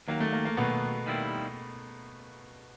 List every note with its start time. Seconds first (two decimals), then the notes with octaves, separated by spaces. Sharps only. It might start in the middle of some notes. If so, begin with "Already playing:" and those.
0.08 D#2 D#3 F#3 A#3
0.20 A3
0.33 A#3
0.45 A#3
0.57 D#2 B2 D#3 F#3 B3
1.06 D#2 D#3 G3 C4 E4